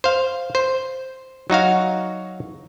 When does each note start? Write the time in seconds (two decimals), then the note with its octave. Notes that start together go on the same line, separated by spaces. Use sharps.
0.04 C5 F5
0.55 C5
1.50 F#3 D#4 F#4 F5